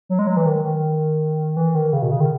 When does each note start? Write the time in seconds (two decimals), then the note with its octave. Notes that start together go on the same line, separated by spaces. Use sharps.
0.09 F#3
0.19 G#3
0.27 F#3
0.37 E3
0.46 D#3
0.64 D#3
1.57 E3
1.75 D#3
1.93 C#3
2.02 B2
2.11 C#3
2.20 D#3